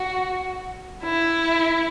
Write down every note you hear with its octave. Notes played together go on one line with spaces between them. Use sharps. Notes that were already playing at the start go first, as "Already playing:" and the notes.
Already playing: F#4
E4